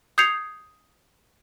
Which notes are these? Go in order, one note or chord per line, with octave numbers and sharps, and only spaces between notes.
D#6 G6 G#6 C7 C#7 F7